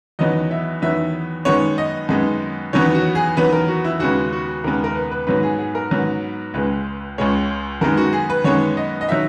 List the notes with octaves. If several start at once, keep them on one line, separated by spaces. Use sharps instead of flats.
E2 D#3 F#3 B3 D#5
E5
E2 D#3 F#3 B3 E5
F#2 D#3 G#3 B3 C#5
D#5
F#2 D#3 G#3 B3
E2 D#3 F#3 B3 C#5
F#4
G#4
E2 D#3 F#3 B3 B4
A#4
F#4
E4
D#2 C#3 G#3 B3 F#4
F#4
D#2 C#3 G#3 B3 A#4
A#4
B4
B4
G#2 F#3 B3 B4
G#4
G#4
A#4
G#2 F#3 B3
C#2 C#3 G#3 B4
C#2 C#3 G#3 C#5
F#2 D#3 G#3 B3 A#4
F#4
G#4
B4
F#2 D#3 G#3 B3 C#5
D#5
D#5
D#3 F#3 E5